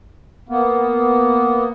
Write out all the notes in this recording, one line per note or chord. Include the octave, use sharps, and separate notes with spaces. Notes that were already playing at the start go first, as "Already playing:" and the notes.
A#3 B3